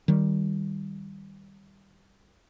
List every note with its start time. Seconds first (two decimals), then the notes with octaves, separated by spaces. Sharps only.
0.08 D#3 G3